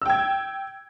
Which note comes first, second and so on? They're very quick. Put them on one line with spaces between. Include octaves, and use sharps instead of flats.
E6 G5 G#6